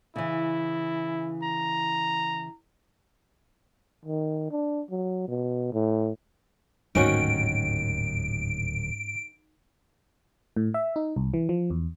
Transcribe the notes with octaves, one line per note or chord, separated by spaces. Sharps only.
C#3 E3 E4
A#5
D#3
D4
F#3
B2
A2
D1 D#2 G#2 D#3 C#4 F#4 D7
A2
E5
D#4
C2
E3
F3
E2